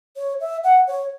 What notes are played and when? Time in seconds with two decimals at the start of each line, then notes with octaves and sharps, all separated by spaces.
0.17 C#5
0.40 E5
0.64 F#5
0.87 C#5